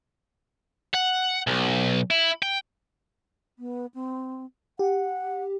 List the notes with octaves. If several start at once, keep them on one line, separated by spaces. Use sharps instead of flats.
F#5
B1
E4
G5
B3
C4
G4 F#5